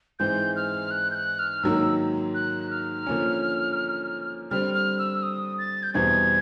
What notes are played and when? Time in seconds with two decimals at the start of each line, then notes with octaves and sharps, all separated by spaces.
0.19 G#2 E3 G#3 C4 G6
0.56 F6
0.91 F#6
1.11 G6
1.15 F#6
1.39 F6
1.63 G#2 D#3 F#3 A#3 E6
2.34 F#6
2.71 F6
3.07 D3 F3 A#3 C#4
4.51 D3 G3 C4 F6
4.74 F6
4.99 E6
5.23 D#6
5.58 A6
5.83 G6
5.94 E2 B2 G3 C4 G#6